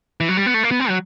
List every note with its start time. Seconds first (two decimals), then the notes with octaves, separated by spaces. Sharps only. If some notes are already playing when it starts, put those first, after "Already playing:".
0.20 E3
0.29 F#3
0.37 G3
0.46 B3
0.54 A3
0.63 A#3
0.71 B3
0.80 C4
0.89 F#3